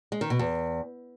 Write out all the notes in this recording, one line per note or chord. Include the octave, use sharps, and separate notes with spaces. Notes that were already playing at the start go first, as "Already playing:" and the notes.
G#3
D#3
B2
E2